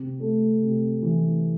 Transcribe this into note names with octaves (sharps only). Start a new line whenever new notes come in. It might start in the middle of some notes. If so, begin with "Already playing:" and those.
Already playing: C3
A3
C3
E3